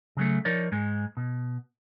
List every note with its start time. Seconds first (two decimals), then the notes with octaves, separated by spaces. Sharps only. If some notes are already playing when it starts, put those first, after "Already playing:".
0.17 C#3 F#3 A3
0.45 F3 D#4 A#4 C#5 D5
0.72 G#2 G#3
1.17 B2